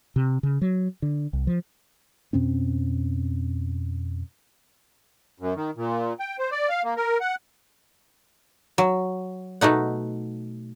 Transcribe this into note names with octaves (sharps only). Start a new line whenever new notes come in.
C3
C#3
F#3
D3
C2
F3
F2 B2 C4 C#4
F#2
D#3
A#2
G5
C5
D5
F5
A#3
A#4
F#5
F#3
B2 A3 D#4 F#5